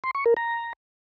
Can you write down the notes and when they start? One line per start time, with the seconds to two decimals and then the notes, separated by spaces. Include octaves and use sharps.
0.04 C6
0.15 C#6
0.26 A#4
0.37 A#5